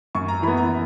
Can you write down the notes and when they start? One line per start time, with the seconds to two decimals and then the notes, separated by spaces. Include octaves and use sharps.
0.15 F#2 C#6
0.28 A#5
0.42 E3 B5
0.48 B3
0.57 A#5